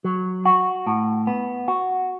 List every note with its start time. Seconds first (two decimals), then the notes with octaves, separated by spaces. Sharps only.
0.04 F#3
0.45 F#4
0.87 A2
1.27 B3
1.68 F#4